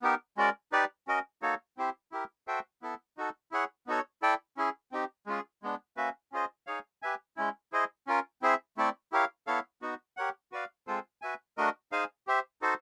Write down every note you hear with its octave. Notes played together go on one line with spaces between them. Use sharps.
B3 D#4 G4 A#4
G#3 C#4 F#4 A#4 D5
D#4 G4 B4 D5
C#4 F#4 A#4 D#5
A#3 D#4 F#4 A4 C#5
C4 E4 G4 C5
E4 G4 A#4
F#4 A4 C5 E5 G5
B3 E4 A4
D#4 F#4 A4
E4 G#4 C#5 F#5
B3 D#4 F#4 A4 C#5
E4 A4 D5 G5
C#4 E4 G#4
C4 D#4 G4
G#3 C#4 F4 G#4
G#3 B3 D4
A#3 C#4 F#4 B4 E5
C#4 F4 G#4 C5 D#5
D#4 G#4 C#5 F5
G4 B4 E5 G#5
G#3 C#4 E4
E4 G#4 C5 D#5
C#4 F4 A#4
C4 E4 G#4 C5 E5
A3 C4 E4 A4 D5
E4 G4 A#4 C#5 F5
B3 E4 A4 C#5 F5
B3 D#4 F#4
G4 A#4 C#5 F#5
F#4 B4 D5 F5
G#3 C4 F4 A4 C5
F#4 B4 E5 G#5
A3 D4 F#4 A#4 D#5
D#4 G#4 C5 F5 G#5
G4 C5 E5
D#4 F#4 A4 C5